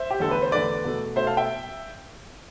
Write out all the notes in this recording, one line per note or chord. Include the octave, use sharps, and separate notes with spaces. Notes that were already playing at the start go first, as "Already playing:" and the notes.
Already playing: C5 E5
G4
E2 D3 A3 A4
B4
C5
E2 D3 A3 B4 D5
B2 A3
B2 A3 C5 E5
F5 A5
E5 G5